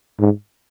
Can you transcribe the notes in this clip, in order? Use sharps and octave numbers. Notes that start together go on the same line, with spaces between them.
G#2